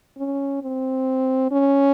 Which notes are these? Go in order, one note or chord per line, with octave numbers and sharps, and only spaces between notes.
C#4
C4
C#4